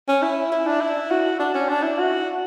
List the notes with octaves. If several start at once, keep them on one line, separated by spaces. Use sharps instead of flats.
C#4
E4
E4
D4
E4
F#4
D4
C#4
D4
E4
F#4